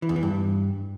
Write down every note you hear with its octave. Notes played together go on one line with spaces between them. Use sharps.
E3
E2
E3
G2